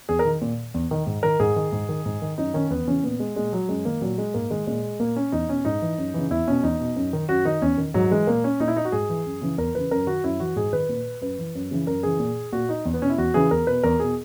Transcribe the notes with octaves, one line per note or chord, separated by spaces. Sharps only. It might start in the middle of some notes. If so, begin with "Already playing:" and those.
E2 G#4
A#4
D#3
A#2
E2
D#3
G#2
D#3 A#4
G#2 G#4
D#3
G#2
D#3
G#2
D#3
F#2 D#4
D#3 C#4
E2 B3
C#3 E3 C#4
A#2 B3
G#3
A#2 G#3
F#3
F#2 G#3
D#3 A#3
A#2 F#3
G#3
G#2 A#3
D#3 G#3
A#2 G#3
A#2 A#3
C#4
E2 D#4
B2 C#4
G#2 D#4
E3
F#2
C#3 E3
E2 E4
B2 C#4
E2 D#4
B2
F#2
D#3
F#2 F#4
D#3 D#4
E2 C#4
D#3
G#2 F#3
E3 G#3
A#2 A#3
C#4
A#2 D#4
E4
D#4
F#4
G#2 G#4
E3
F#2
C#3 E3
E2 A#4
C#3 E3 B4
F#2 A#4
D#3 F#4
F#2 E4
E3 F#4
G#2 G#4
D#3 B4
A#2
F#2 B4
E3
F#2
C#3 E3
F#2 A#4
C#3 E3 G#4
A#2
A#2 F#4
D#4
E2
B3
B2 C#4
E4
E2 F#4
C#3 E3 G#4
E2 A#4
B2 B4
E2 A#4
B2 G#4